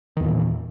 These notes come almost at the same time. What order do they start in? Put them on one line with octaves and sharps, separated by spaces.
D#3 E2 A#2 E3